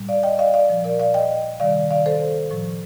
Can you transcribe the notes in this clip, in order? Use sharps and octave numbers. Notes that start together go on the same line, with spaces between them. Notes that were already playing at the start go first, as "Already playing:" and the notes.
Already playing: A2 G3
D5 F5
D#5 G5
D5 F5
D5 F5
A#2 F3
A#4 D5
D5 F5
D#5 G5
C3 D#3 G3 D5 F5
D5 F5
A4 C5
A2 F3